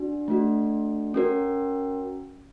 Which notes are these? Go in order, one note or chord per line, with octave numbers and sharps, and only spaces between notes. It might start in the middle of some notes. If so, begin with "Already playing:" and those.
Already playing: D4 F#4
A3 D4 F#4
C#4 F#4 A#4